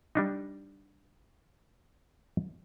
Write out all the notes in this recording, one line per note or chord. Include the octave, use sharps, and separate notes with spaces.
G3 D4 D#4